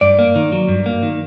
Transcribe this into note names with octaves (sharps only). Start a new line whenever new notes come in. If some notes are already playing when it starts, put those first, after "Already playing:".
G2 D5
A#3
D#3
F#3
G2
A#3
D#3